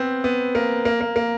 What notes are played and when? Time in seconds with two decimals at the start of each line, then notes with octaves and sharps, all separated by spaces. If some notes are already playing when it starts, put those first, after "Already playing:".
Already playing: B3 C4
0.24 B3
0.55 A#3
0.85 A#3
1.01 A#3
1.16 A#3